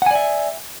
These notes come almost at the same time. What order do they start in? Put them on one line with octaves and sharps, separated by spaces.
F#5 G#5 D5 E5